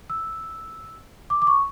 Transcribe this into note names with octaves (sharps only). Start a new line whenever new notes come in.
E6
D6
D6
C#6